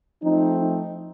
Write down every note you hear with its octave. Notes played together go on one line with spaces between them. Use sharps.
F3 A3 C4 D#4
D#4